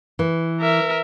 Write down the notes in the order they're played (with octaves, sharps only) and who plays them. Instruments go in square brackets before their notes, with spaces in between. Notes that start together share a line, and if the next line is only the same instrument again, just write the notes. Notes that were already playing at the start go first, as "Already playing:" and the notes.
[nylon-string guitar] E3
[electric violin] A#4 E5